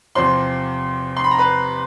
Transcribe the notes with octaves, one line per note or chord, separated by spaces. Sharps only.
E2 C3 F3 C5 C6
C6
B5
A#5
B4 B5